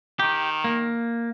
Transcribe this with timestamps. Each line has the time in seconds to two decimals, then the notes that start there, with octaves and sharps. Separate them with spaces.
0.19 D#3 G4
0.64 A#3